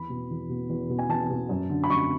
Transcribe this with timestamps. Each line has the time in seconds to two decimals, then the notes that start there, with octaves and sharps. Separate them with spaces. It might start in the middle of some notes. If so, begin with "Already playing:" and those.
Already playing: E2 B5
0.10 B2
0.31 E2
0.49 B2
0.69 E2
0.89 B2
0.98 G#5
1.09 E2 A5
1.30 B2
1.49 F#2
1.70 D3
1.84 B5
1.90 F#2 C#6